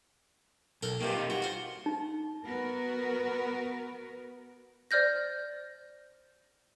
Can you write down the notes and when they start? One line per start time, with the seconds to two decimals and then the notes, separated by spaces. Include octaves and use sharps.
0.83 B1 A4 A#4
1.01 G2 C3 D#3 A#3 F4
1.14 D#4 F4
1.30 F#4 G4
1.42 F4 C5
1.86 D#4
2.44 B3 F#4 A#4 B4
4.91 C5 D5 F6 G6 A#6